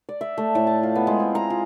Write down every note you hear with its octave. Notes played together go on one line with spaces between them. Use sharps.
D5
E5
A3
A2
A5
F4
B3
G#3
C4
A#5
F4